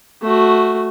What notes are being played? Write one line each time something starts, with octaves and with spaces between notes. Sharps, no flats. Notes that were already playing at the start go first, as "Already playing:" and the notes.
A3 F#4